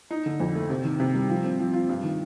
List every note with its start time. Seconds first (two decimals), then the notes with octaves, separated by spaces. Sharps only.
0.11 D#4
0.26 D3
0.40 F2
0.55 A3
0.70 C3
0.85 D#3
1.00 C3
1.15 G3
1.29 F3
1.44 C4
1.59 F3
1.73 F4
1.89 G2
2.04 D#3